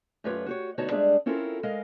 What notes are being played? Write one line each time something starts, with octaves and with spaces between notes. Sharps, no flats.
F#2 A3 F4 G4 B4 C#5
F#4 G4 C#5
D2 B3 D#4 F#4 C#5 A5
G3 G#3 D4 G#4 E5
C4 C#4 E4 F4 A4 A#4
G#3 A#4 D#5 F5